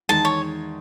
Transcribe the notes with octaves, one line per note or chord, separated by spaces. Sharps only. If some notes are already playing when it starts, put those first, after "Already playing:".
E2 D#3 G#3 D#4 A5
C#5